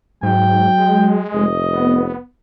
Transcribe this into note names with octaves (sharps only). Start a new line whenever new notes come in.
G#2 F#3 G5
G#3
F1 D#5
B3